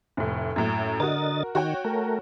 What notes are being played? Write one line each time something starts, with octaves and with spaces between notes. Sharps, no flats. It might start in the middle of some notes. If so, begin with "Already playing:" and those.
F1 A2
F#2 A2
D3 F#4 A#4 D#5 A6
D#3 F#4 C#5 G5
A3 A#4